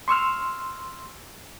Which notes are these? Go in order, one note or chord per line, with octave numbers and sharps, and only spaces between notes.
C6 C#6 E6 F6